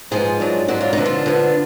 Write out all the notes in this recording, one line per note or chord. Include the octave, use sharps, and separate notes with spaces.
G#2 F3 B3 F4 G#4
G#2 F#3 D4
G#2 F#3 D4 F#4
F4
D#4
D3 F3 B3 D4
F4
D3 F3 B3 D4